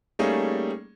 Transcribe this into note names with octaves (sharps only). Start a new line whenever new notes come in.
G3 A3 A#3 C#4 D#4 G#4